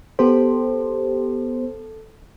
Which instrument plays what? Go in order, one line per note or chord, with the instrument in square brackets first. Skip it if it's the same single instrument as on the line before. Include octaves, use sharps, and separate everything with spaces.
[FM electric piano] B3 G4 C5 [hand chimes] A4